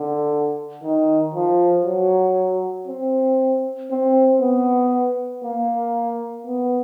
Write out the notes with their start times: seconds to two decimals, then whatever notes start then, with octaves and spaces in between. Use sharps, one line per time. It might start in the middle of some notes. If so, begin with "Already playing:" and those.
Already playing: D3
0.84 D#3
1.35 F3
1.85 F#3
2.87 C4
3.91 C4
4.41 B3
5.44 A#3
6.46 B3